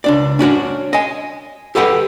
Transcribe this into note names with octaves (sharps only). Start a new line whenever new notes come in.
C#2 D4 D5
C#4 D4 F#4 C#5
D#5 G#5
G4 A4 B4 D#5 F#5 G5